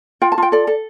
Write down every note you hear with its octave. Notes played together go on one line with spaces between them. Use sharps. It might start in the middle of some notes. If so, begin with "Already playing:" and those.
F4 G5
A5
F4 G5
A4 D5
A4